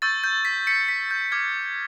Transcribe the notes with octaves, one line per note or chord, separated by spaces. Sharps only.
C#6 E6 G6 A6
G6
B6
B6 C#7
B6
G6
D6 F6 G#6